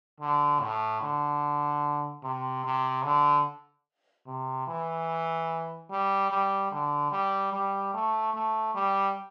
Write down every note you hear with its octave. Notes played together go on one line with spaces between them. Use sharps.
D3
A2
D3
C3
C3
D3
C3
E3
G3
G3
D3
G3
G3
A3
A3
G3